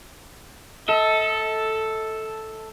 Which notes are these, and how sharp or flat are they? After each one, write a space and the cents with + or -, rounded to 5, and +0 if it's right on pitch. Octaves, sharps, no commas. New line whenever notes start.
A4 +0 D#5 +45